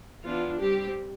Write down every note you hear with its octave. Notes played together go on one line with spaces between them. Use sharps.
E3 B3 D4 F4
G3 C4 G4